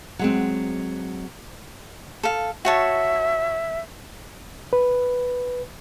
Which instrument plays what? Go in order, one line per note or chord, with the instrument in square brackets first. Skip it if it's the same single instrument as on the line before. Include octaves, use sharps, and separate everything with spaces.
[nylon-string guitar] F#3 G#3 C4
[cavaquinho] A4 F5
[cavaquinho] F#4 C#5 A5 [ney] E5
[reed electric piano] B4